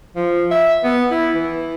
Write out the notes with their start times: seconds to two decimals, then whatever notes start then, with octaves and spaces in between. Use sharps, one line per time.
0.16 F3
0.51 E5
0.84 B3
1.11 E4
1.35 E3